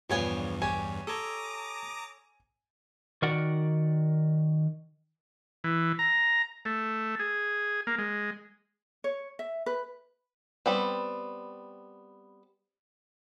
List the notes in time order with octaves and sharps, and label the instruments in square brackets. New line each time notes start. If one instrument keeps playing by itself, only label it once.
[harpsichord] A#1 B3 F5 [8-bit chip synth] E2 G2 [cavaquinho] G4 C#5 G#5
[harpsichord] G4 [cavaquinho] C#5 [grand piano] G#5
[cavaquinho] A4 C#5 [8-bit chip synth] A#5 D6 D#6
[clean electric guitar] D#3 F#4 A#4 D5 F#5
[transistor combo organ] E3
A#5
A3
G#4
A#3
G#3
[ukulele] C#5
E5
B4
[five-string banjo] G3 B3 C4